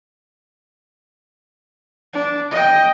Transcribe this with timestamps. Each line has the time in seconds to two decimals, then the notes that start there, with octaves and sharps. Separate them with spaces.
2.14 D4
2.51 D#5 G5